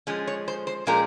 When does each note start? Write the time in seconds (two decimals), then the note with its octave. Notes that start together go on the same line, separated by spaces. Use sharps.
0.07 F3 G#3 C#4
0.27 C#5
0.48 C5
0.67 C5
0.87 A#2 F3 G#3 C#4 A#4